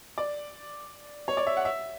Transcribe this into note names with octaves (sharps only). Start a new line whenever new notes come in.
D5
C#5
D5
E5
F#5
E5